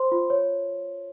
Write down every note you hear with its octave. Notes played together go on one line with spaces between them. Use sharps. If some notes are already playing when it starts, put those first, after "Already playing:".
Already playing: C5 C6
F4
C#5